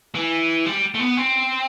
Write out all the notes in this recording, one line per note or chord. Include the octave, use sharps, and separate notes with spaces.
E3
G3
A3
B3
C4